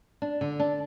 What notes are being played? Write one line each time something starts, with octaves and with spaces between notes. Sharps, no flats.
D4
D3
D4